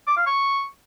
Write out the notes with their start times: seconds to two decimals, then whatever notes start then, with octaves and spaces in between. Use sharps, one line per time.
0.07 D6
0.17 F5
0.27 C#6